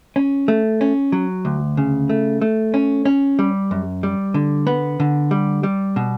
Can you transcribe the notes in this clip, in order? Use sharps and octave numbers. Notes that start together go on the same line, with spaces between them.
C#4
A3
C#4
F#3
D2
C#3
A3
A3
C#4
C#4
G3
F#2
G3
D3
B3
D3
G3
G3
B2